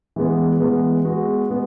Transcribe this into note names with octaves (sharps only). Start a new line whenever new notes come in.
E3 G#3 B3
E3 G#3 B3
G#3 B3 F#4
G#3 B3